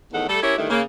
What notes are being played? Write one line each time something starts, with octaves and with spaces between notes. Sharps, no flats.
E2 A2 D#3 A4 F#5
G3 A3 A4
C#4 E4 G4 A#4 C#5
G2 D3 D#3 A3 E4
C#3 A#3